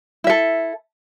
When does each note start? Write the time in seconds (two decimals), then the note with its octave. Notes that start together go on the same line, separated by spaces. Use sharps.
0.24 E4
0.27 E5
0.30 A4